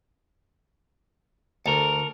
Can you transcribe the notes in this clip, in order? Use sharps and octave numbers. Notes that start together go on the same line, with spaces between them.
D2 A4 A#4